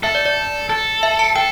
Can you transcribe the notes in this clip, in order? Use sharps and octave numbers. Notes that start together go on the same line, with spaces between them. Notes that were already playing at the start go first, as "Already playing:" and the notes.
A4 E5
D5
D5
A4
E5
A5
A4 G5